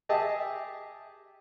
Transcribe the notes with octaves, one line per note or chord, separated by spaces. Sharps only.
G4 G#4 D#5 E5 A5